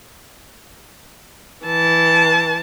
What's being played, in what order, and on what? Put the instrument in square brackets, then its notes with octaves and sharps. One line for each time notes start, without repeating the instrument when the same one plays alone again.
[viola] E3 A5